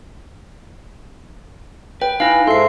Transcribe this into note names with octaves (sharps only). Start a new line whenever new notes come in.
B4 G5
D#4 E4 B4 F5 G#5
G#2 E4 A4 E5 C6 C7